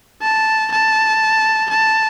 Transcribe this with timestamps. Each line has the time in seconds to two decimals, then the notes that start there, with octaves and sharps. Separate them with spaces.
0.22 A5
0.72 A5
1.70 A5